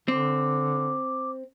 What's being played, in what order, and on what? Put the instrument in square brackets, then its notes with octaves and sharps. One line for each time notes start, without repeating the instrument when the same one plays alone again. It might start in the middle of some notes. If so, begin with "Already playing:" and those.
[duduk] D3 [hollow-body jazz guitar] C4 [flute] D6